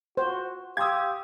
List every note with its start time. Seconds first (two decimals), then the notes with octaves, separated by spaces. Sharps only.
0.17 F#4 C5
0.77 G4 F5 C6 D#6 E6 G#6